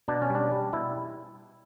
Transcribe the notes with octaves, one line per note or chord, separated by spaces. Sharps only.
B2 D4
C#4
G3
D4
G3
B2 E4